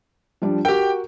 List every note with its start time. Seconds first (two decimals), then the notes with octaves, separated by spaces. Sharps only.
0.42 F3 G3 D4
0.65 F#4 G4 A#4 G5